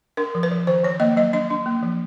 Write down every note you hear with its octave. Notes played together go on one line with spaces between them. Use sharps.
D4 A#4
F3
B4
F3
D#3 C5
D#3 C#5
A#3 D#5
F#3 D#5
D4 D#5
D4
A#3
F3